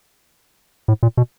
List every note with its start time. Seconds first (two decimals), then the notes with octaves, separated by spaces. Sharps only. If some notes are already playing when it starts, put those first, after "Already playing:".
0.88 A2
1.03 A#2
1.17 B2